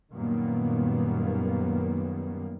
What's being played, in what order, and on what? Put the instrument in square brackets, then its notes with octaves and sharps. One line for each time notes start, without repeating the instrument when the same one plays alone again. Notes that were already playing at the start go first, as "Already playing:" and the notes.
[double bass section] F#2 A#2 D#3 G3 A#3 B3